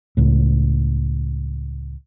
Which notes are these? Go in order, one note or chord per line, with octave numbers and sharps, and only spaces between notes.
C#2 A2